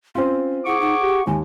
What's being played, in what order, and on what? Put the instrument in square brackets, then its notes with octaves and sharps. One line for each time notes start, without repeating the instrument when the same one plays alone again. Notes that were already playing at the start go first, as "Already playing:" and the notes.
[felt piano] C4 F4 [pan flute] C#4
[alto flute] E4 [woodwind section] G#4 C#6 D6 [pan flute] F#5
[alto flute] D#4 [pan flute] F#5
[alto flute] G4
[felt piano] D#2 [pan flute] G#3 [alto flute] G#5